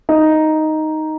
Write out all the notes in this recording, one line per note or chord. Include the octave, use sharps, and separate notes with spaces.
D#4